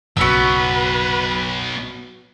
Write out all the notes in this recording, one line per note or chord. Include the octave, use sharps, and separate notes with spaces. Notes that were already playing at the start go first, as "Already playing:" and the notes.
F#1 B1 F#3 B3 F#4 B4 E6